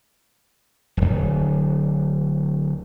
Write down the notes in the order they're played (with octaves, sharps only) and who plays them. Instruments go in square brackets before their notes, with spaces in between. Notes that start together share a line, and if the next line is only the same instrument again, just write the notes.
[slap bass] D1 G#1